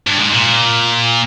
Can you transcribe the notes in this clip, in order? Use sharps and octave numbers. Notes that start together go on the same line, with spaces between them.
G2
G#2
A#2